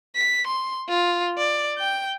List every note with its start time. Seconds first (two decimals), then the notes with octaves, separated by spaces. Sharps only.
0.15 B6
0.46 C6
0.88 F4
1.37 D5
1.78 G5 G6